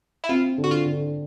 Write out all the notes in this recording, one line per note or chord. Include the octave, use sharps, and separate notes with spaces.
E4
C4 F4
D3
F#4
F4
D3